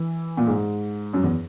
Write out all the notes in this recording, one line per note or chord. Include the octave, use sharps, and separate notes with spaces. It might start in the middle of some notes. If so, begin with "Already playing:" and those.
Already playing: E3
A#2
G#2
F#2
E2